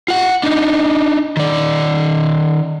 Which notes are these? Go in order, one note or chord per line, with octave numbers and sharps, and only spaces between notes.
F4 F#5
D4 D#4
D#3 D5